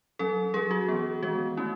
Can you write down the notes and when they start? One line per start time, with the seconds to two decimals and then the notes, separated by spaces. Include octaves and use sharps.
0.19 F#3 C#4 A4
0.54 F#3 C#4 G#4
0.71 F#4
0.88 E3 B3
1.22 D#3 G#3 B3 F#4
1.57 A3 C#4 E4